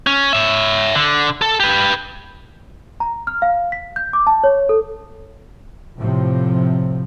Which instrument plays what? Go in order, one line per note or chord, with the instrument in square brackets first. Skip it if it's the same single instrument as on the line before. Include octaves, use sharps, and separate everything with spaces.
[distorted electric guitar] C#4
C#5 E5
D3
A4
G4 B4
[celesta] A#5
F6
F5
B6
G6
D6
A5
C#5
A4
[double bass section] A2 C3 F3